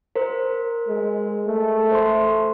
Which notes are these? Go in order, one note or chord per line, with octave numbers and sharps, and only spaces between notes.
A#4 C5
G#3
A3
C5 C6